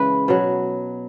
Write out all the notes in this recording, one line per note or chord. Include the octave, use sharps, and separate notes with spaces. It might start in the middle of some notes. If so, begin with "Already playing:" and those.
Already playing: C#3 E3 G#3 B4
B2 F#3